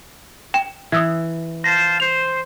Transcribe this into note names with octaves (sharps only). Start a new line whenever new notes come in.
G5 E7
E3 D#6 E6 G#6
C5 F5 A5 A#6
C5 F7